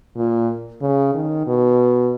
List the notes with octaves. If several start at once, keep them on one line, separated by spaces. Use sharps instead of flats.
A#2
C#3
D#3
B2